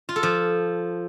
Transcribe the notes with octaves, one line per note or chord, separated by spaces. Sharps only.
F4
A4
F3